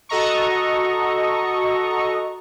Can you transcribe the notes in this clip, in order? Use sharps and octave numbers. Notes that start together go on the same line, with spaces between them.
F#4 A4 D#5 A#5 C#6